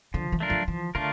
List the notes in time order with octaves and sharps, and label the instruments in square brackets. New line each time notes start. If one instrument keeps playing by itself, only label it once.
[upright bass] D3 [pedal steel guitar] F3
[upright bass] E3
[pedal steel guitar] A3 D4 F4 A#4
[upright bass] F3
[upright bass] E3 [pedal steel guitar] F3
[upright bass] D3 [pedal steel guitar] A3 D4 F4 A#4